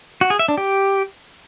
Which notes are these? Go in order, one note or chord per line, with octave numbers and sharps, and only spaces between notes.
F#4
G#4
E5
D4
G4